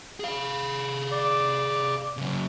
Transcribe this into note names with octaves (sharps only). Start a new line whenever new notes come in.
G#4 F5
D5
C#3 F#3